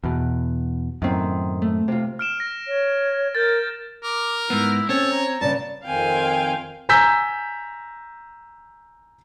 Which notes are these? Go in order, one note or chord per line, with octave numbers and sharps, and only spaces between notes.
E2 B2
F#2 A2 D#3 C4
A3
C3 F4
F6 D7 E7
A#6
C#5
A#4 G6 A6
A#4 D6
G#2 B3 E4
C4 C#4 A4 C#5
A#5
G2 C#3 A5
F2 D#3 C4 F5 G5 G#5
G#5 A#5 E6 G6 B6